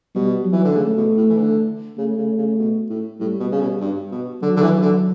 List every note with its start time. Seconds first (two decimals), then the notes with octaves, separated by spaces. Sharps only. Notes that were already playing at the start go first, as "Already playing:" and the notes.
0.15 B2 G3
0.45 F#3
0.53 E3
0.64 D3
0.77 C#3 A3
0.97 B2
1.17 A2
1.30 E3
1.38 D3
1.98 C#3 A3
2.18 C#3
2.38 C#3
2.59 B2
2.90 A2
3.20 A2 G3
3.40 B2
3.52 C#3
3.61 B2
3.80 G2
4.12 B2
4.42 D3 F#3
4.56 D3
4.63 E3
4.82 D3